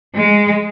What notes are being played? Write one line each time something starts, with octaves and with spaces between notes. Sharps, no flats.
G#3